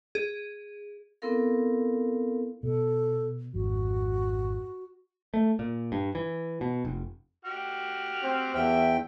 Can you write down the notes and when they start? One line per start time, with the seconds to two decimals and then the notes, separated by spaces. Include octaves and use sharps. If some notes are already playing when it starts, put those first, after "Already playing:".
0.15 G#4
1.22 B3 C4 E4 A4 A#4 F5
2.63 B2 A4
3.54 G#1 F2 F#4
5.34 A3
5.59 A#2
5.92 G2
6.15 E3
6.61 B2
6.85 F1
7.45 F#4 G4 F6
8.23 C4
8.55 E2 E5 G5